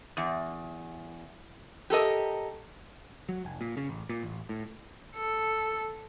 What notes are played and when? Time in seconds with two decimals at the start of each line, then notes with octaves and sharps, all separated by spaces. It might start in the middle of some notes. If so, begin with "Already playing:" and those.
0.17 E2
1.90 G4 A4 A#4 D#5
3.29 F#3
3.45 F1
3.61 A#2
3.77 C#3
3.89 A1
4.09 A#2
4.23 A1
4.49 A2
5.17 A4